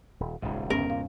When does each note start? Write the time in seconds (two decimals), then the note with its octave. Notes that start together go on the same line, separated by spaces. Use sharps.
0.20 D#1
0.42 D#1 G#1 G#2 C#3
0.70 G1 E2 G2 B2 B3 C#4 A#4
0.90 A#2 F5